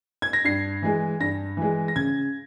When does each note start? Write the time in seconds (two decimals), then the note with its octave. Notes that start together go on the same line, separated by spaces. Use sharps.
0.22 G#6
0.33 A#6
0.44 G2 C7
0.82 E3 G#3
1.20 G2 A#6
1.57 E3 G#3
1.88 A#6
1.96 C#3 G#6